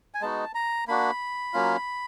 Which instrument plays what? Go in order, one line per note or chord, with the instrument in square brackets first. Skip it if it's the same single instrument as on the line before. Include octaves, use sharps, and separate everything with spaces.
[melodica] G#5
G#3 B3 D#4 F#4 A5
A#5
A#3 D4 F#4 B5
F#3 A#3 C#4 F4